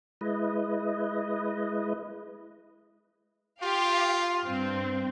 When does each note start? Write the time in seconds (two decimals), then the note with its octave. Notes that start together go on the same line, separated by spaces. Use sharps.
0.21 G#3 E4 B4 D#5
3.62 F4 G4 F5
4.43 G2 C4